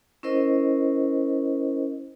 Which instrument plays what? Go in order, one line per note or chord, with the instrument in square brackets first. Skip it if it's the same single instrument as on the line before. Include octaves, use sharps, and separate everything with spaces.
[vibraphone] C#4 E4 A#4 C5 D#5